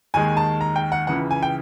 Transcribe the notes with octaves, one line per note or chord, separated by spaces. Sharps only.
D#2 D#3 G#3 G#5
A5
A#5
G5
F#5
C#2 C#3 E3 F#5
G#5
G5